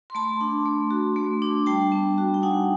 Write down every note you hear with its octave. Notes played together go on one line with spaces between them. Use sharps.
C6
A3 A5 B5
D4
A3
F#4
A3
D4
G3 G5 A5
B3
F#4
G5
D#4 F#5 G#5